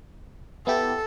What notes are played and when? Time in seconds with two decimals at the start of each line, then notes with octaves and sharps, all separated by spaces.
0.67 B3 E4 G4 A4